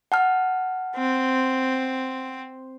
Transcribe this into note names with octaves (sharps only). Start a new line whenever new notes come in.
F#5 A5 F6
C4